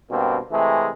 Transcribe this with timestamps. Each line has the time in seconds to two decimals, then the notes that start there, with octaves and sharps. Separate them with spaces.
0.11 G2 B2 A#3 C4
0.52 C3 E3 G#3 A3